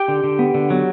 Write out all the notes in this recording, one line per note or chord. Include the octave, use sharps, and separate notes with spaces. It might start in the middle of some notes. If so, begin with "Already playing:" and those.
Already playing: G4 G5
D3
D3
B3
D3
F#3